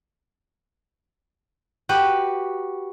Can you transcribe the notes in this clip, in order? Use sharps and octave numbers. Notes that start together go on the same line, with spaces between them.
F#4 G4 B4